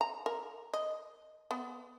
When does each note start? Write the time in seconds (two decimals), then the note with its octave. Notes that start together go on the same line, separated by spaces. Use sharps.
0.01 A#5
0.26 A#4
0.73 D#5
1.51 B3